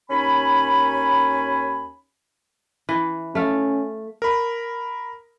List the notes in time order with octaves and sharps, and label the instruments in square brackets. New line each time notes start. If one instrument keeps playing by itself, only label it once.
[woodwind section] D#2 C#4 D#4 G#5 B5
[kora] E3
[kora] A3 F5 [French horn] C#4
[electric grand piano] A#4 B5